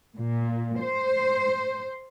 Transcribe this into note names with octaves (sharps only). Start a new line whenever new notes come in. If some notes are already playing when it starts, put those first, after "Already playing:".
A#2
C5